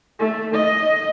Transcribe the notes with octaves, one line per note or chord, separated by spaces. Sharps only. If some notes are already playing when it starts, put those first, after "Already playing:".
A3
D#5